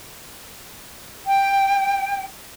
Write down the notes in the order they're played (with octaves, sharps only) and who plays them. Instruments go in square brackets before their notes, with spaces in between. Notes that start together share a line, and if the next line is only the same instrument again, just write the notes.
[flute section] G5